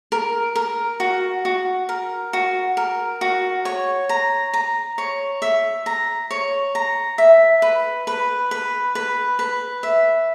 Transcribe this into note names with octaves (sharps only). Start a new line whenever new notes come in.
A#4
A#4
F#4
F#4
A#4
F#4
A#4
F#4
C#5
A#5
A#5
C#5
E5
A#5
C#5
A#5
E5
B4
B4
B4
B4
B4
E5